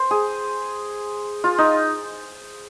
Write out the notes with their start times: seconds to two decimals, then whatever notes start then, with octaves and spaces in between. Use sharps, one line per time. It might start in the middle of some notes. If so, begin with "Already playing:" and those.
Already playing: C5
0.11 G#4
1.44 F4
1.58 D#4